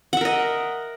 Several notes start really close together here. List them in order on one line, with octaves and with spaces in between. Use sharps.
F#5 E5 A#4 D#5